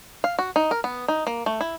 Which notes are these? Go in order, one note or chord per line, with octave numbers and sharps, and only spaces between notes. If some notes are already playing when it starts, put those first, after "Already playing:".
F5
F#4
D#4
A#4
B3
D#4
A#3
A3
E4